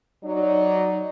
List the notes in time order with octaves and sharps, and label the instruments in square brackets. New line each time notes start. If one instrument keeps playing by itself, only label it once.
[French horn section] F#3 D#4 D5